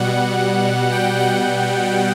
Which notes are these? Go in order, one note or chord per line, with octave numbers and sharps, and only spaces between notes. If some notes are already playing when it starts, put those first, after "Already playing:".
Already playing: B2 G3 F#5
G5
F#5